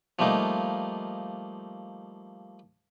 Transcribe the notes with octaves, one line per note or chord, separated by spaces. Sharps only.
F3 G3 A3 A#3 D#4